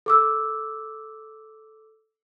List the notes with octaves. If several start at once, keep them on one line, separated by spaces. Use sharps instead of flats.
A4 D6 E6